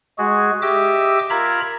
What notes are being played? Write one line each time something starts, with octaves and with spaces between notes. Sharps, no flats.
G#3 F#4 G#4
G4 D#5 E5 D6 E6
F4 A#4 E5 A#5 B5 G#6